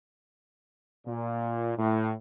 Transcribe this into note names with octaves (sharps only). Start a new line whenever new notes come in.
A#2
A2